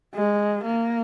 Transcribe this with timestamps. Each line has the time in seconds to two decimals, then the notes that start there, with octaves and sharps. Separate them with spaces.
0.15 G#3
0.64 A#3